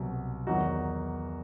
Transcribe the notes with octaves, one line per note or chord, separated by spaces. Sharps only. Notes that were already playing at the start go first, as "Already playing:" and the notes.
Already playing: C2 B2 F#3
E2 D#3 F#3 D#4 F#4